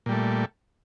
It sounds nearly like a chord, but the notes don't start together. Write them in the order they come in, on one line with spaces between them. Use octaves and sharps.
A#2 G3 A3